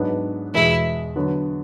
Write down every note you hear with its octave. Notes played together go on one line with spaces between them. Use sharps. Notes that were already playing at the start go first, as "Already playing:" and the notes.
Already playing: G#2 F#3 B3 D4
E2 B2 G#3 E4
D3 F#3 B3